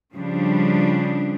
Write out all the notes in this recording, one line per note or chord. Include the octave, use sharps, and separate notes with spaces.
C#3 F3 G3 D4